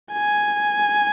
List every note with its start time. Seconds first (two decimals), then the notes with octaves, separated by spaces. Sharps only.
0.12 G#5